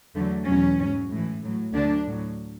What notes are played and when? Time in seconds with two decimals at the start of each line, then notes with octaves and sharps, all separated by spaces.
0.15 E2 D3 F#3 A3
0.47 E2 B2 F#3 C#4
0.79 G#2 F#3
1.11 A2 E3
1.43 A2 F#3
1.74 D2 D3 F#3 D4
2.06 A2 F#3